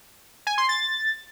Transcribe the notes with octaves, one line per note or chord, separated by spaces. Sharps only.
G#5
C6
A6